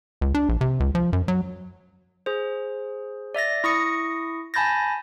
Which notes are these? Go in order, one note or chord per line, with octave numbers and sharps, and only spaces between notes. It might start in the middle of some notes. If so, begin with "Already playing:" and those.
C#2
D4
A#1
C3
C#2
F3
F#2
F#3
G#4 C5
D5 E5 A6 A#6
E4 C#6 D#6 A#6 C#7
G#5 A5 B5 G6 A6 A#6